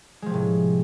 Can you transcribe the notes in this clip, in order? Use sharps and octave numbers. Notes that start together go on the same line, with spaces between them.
A2 C3 F3 G#3